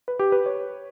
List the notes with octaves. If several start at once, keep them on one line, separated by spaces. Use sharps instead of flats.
B4
G4
B4
C#5